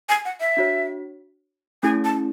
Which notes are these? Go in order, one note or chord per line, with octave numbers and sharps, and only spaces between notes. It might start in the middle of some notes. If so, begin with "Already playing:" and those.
G#5
F#5
E5
D4 F#4 C#5
A3 C#4 E4 G#4 G#5
A5